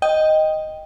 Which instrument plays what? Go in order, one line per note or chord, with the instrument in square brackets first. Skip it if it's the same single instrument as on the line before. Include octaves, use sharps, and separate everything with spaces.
[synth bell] D#5 G5